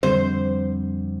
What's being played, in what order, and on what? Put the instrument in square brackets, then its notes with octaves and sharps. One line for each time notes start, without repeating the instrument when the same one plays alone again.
[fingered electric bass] F2 D3 G3 C4 [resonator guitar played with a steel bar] C5